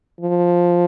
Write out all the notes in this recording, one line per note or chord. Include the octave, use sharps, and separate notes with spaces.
F3